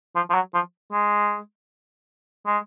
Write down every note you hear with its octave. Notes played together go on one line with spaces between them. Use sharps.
F3
F3
F#3
F3
G#3
G#3